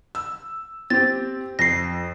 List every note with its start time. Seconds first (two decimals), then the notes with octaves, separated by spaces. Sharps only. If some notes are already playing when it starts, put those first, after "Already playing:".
0.15 E6
0.90 C4 G4 A6
1.59 F2 A#6 C7